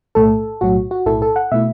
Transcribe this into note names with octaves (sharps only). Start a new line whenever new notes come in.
B1 A2 A3 A4
B1 A2 F#3 F#4
F#4
B1 A2 A3 E4 A4
A4
F#5
B2 A3 E4 E5